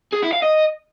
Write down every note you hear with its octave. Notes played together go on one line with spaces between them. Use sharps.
G#4
E4
F5
D#5